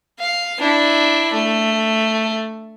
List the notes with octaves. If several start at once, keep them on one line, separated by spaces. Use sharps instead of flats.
F5
D4 E4
A3